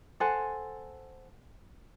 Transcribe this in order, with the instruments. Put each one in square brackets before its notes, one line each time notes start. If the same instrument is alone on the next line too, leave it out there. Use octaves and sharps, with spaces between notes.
[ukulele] A4 C5 F#5 G#5